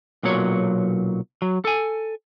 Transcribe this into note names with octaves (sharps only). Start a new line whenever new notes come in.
B1 A#2 F#3 C#5
F#3
A4 G#5